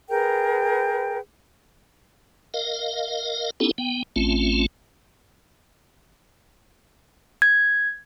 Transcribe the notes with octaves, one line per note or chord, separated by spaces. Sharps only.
G#4 A#4 B4 G5
A#4 D#5 F5
B3 C#4 D#4 E4 G4 A4
B3 G5
A1 A3 C4 C#4 F4
G#6